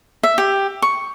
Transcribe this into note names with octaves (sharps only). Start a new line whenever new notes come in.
E5
G4
C#6